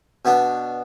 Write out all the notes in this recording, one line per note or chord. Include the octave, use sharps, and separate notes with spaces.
B2 B3 D4